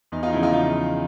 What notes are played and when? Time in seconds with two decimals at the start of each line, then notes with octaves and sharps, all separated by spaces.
0.12 E2 D#4
0.23 D#4 F4
0.32 C#3 F3 E4
0.43 D#4 F4
0.53 D#4 F4